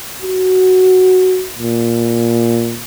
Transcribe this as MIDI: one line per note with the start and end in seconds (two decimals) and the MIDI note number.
0.22 1.47 66
1.58 2.80 46